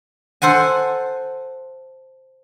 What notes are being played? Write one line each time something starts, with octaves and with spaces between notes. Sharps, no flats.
A4 C5 F#5 G#5